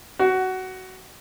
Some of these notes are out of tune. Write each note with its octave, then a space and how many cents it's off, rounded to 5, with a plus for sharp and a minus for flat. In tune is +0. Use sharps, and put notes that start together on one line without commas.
F#4 +15